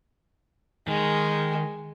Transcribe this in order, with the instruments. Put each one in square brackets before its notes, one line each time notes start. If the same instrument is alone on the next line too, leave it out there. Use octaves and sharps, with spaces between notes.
[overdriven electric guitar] D#3 [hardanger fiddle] G#3